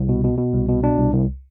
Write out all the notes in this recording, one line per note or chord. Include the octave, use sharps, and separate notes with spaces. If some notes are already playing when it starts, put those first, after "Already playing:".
Already playing: C2
B2
B2
B2
C2
B2
B2 D4
C2
C2